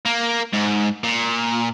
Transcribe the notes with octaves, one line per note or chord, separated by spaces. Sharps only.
A#3
G#2
A#2